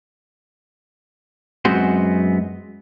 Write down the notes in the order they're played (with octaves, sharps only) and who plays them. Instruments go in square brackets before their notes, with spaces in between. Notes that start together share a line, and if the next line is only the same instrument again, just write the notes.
[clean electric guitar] F#2 G#3 B3 C4 F#4 C5